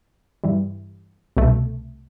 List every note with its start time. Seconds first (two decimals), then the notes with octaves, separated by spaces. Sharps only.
0.44 G2 E3 G3
1.37 C2 B2 A3